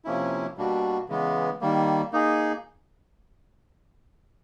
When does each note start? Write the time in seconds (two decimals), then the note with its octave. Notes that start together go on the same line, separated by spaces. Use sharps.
0.05 C3 F3 A#3 C#4 E4
0.57 B2 G3 A#3 D4 F#4
1.09 C#3 E3 G#3 B3
1.61 D#3 G3 A#3
2.12 A#3 D#4 G#4